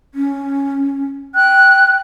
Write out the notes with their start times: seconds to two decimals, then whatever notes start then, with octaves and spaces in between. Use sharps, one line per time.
0.14 C#4
1.35 G5 F#6